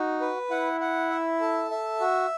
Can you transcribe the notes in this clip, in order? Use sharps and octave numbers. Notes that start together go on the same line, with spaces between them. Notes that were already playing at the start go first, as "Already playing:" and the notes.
Already playing: D#4 F#4
B4
E4 F#5
F#5
E5
A4
E5
F#4